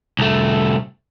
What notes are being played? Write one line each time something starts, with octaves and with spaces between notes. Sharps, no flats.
C2 A3